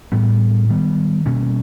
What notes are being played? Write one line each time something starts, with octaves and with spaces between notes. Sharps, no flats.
A2 E3 G3 B3
D#3 G3 B3
B2 G3 A#3 C#4